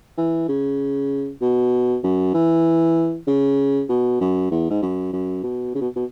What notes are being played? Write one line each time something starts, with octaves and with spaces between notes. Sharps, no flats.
E3
C#3
B2
F#2
E3
C#3
B2
F#2
E2
G#2
F#2
F#2
B2
C#3
B2
B2